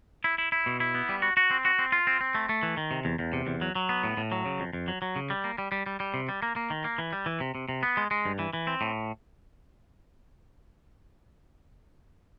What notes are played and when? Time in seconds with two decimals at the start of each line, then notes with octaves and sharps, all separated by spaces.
0.24 E4
0.38 E4
0.52 E4
0.66 B2
0.80 E4
0.95 B3
1.09 G3
1.22 F#4
1.37 F#4
1.51 C4
1.65 F#4
1.79 C4
1.92 F4
2.07 C4
2.21 C4
2.35 A3
2.49 A3
2.63 E3
2.77 D#3
2.91 C3
3.05 E2
3.19 E2
3.33 C3
3.47 E2
3.61 F#3
3.75 F#3
3.89 B3
4.04 A2
4.17 A2
4.32 F#3
4.46 C#3
4.60 F2
4.73 F2
4.88 F#3
5.02 F#3
5.16 C#3
5.30 G3
5.44 A#3
5.58 G3
5.72 G3
5.86 G3
6.00 G3
6.14 C3
6.29 G3
6.42 A#3
6.56 A#3
6.70 D#3
6.84 A#3
6.98 E3
7.13 G3
7.26 E3
7.40 C3
7.55 C3
7.69 C3
7.83 B3
7.97 G#3
8.11 G#3
8.25 G2
8.39 E3
8.53 E3
8.67 C4
8.81 A2